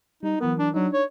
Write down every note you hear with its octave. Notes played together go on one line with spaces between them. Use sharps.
G3 D#4
E3 F#3 B3 A#4
D4
F#3 D4 D#4
C#5